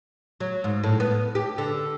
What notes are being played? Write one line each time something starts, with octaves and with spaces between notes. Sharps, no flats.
F#3
G#2
A2
B3
G4
D3